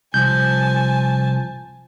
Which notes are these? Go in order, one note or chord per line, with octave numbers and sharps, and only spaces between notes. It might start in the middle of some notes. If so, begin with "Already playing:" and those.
C2 F3 G#5 A5 G6